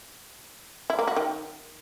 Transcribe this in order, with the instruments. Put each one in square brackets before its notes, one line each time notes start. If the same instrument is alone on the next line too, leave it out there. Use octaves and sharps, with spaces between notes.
[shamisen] E4
A#3
F#4
D#3